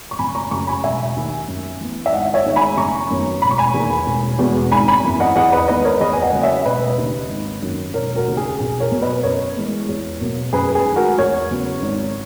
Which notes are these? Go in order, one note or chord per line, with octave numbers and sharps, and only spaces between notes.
C#6
F#1 G#5 B5
A#5 C#6
F#2 C#3 A#5 C#6
G#5 B5
E1 E5 G#5
D#2 D#3
F#2
E3 B3
E5
G#1 D#5 F#5
C#5 E5
G#2 D#3 G#3 B3
G#5 B5
F#1 A#5 C#6
F#2 D#3 F#3 B3
E1 B5
C#6
G#5 B5
E2 D#3 A#3
E1
E2 B2 G#3
G#1 G#5 B5
G#5 B5
F#2 E3 B3
D#5 F#5
E2 D#5 F#5
B4 D#5
D#3 G#3 B3 B4 D#5
A#4 C#5
E2 B4 D#5
G#5
D#5 F#5
C#3 F#3 A#3
C#5 E5
E1 B4 D#5
D#2 C#3
G#1
F#2 D#3 F#3 A#3
E1 A#4 C#5
F#4 A#4
D#2 C#3
G#4
B1 G#4
A#4 C#5
B2 F#3 B3
B4 D#5
F#2 A#4 C#5
E3 G#3 B3
E2
B2 F#3 A#3
F#2 G#4 B4
G#4
D#3 G#3
F#4 A#4
E2 A#4 C#5
C#3 F#3 B3
G#1